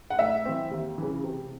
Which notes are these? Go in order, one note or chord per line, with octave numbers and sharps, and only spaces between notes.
F#5
A2 E5
E3 C4
D#2
C#3 E3
C3